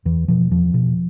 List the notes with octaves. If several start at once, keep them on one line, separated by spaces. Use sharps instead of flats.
E2 E3
B2 F3
E2 F3
B2